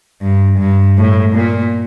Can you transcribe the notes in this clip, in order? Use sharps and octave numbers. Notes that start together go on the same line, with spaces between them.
G2
G2
A2
A#2